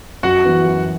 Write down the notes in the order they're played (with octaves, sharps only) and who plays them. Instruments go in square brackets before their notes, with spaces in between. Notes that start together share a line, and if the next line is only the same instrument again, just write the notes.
[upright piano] F#2 [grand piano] F#4 F#5
[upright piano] E3 B3
F#2